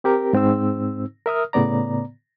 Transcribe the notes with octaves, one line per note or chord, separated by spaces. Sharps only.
C4 G4 A#4 A#5
G#2 C4 D#4 E6
A#4 E5 D#6 F6
A2 C#3 B3 D5 A#5